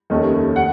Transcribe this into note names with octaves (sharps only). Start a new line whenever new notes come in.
F1 D#2 D#3 A3 C#4
F#5